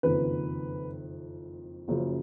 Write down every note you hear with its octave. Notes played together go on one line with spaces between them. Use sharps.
F#1 F2 D#3 B4
F#1 F#2 C#3 F3